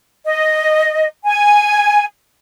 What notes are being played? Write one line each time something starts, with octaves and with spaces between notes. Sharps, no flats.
D#5
G#5